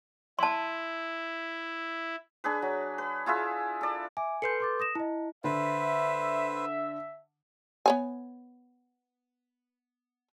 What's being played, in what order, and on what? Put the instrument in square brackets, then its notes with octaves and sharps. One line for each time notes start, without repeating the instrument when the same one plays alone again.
[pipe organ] E4 [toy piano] A5 C6
[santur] D4 G#4 B4
F#3
B4
E4 F4 G#4 E5
A4 D5
[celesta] E5 D6 [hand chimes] G#5
[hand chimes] A4 B4 G6 [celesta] C6 C7 C#7
[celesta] C6 D6 A6
D#6 A#6 E7
[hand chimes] E4 [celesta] D#5 A5
[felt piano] D3 [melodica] B4 C5 [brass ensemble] E5
[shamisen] B3 C#5 G#5